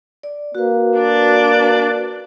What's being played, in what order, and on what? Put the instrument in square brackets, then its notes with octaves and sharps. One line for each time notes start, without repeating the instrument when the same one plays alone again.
[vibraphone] D5
[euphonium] A#3 [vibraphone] F#4 B4
[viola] D4 D5